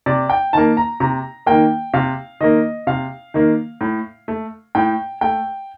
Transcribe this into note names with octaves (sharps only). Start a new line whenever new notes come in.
C3 D5
G5
D#3 A#3 A5
A#5
C3 A#5
D#3 A#3 G5
C3 F5
D#3 A#3 D#5
C3 F5
D#3 A#3
A2
A3
A2 G5
A3 G5